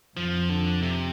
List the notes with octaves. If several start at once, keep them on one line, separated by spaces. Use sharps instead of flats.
F2 F3
D3
C3